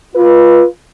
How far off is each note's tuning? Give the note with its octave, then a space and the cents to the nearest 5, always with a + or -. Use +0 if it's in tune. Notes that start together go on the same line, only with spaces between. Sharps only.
F4 +0 B4 -20